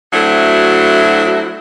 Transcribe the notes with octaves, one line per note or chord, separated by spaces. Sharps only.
F#3 A3 C4 D4 E4 F#4